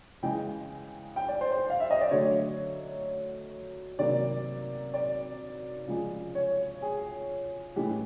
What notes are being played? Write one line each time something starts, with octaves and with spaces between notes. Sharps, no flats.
C#3 E3 G#3 G5
G5
D5
C5
C5
F5
E5
D#5
D5
D3 F#3 A3 C#5
C3 D#3 F#3 A#3 D5
D5
C#3 F3 G#3
C#5
G#4
A2 E3 G#3 G4